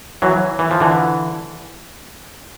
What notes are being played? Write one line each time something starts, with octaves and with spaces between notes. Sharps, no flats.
E3 F#3
E3
F3
D3 E3